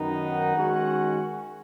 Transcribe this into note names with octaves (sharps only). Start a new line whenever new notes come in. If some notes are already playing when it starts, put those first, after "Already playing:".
Already playing: F#2 D#3 B3 D#4
F#5
D#3 G#3 C#4 F#4